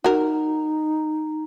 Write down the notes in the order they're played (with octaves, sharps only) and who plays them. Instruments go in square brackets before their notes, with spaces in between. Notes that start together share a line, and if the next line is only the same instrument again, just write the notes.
[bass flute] D#4 [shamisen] F#4 A#4